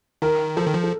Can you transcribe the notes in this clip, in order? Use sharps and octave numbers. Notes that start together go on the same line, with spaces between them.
D#3 A#4
F3 A4
D#3
F3
A4